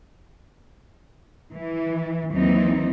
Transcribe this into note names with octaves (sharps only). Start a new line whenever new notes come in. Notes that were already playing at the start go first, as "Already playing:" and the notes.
E3
D#2 E3 F#3 C4 D#4